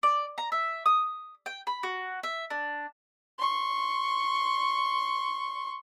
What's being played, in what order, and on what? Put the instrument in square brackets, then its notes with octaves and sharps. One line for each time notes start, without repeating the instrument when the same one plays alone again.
[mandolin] D5
A#5
E5
D#6
G5
B5
F#4
E5
D4
[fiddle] C6 C#6